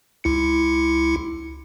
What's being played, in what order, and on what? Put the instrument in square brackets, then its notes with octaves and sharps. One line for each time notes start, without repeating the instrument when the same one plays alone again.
[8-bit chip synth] C#2 E4 C#7